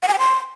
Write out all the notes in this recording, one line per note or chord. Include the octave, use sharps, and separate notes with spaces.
F#5
G#5
G5
C6